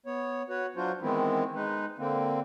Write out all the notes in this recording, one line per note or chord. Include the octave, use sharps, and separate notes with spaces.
B3 C#5
F#4 B4 C#5
F#3 D4 F4 F#4 C5
D#3 E3 G#3 B3 C4 E4
G#3 D#4 B4
D3 A#3 C4